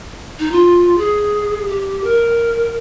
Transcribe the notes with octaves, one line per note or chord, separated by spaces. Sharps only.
D#4
F4
G#4
G4
A#4